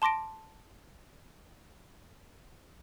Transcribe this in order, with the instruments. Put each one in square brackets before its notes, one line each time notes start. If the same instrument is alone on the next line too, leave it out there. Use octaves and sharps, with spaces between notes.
[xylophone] A5 C6 D6 A#6 D7